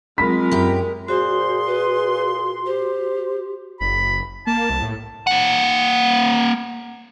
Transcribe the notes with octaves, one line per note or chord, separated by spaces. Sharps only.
F#3 G#3 C4 F4 A#4 B5 B6
F#2 G4
A#2 F#4 G#4 C5 C6
B4
G4 C5
F#1 B5
A#3 A5
C2
A2
A#3 F#5